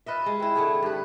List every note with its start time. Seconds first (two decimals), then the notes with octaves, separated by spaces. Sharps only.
0.06 F4 B4 D#5 E5
0.26 G#3
0.40 C4 E4
0.55 D3 A3 G#4
0.82 G2 B4